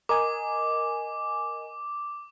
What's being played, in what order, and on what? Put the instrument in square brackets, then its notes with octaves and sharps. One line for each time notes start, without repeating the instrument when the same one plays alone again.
[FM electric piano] A#4 D#5 G#5 [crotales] D6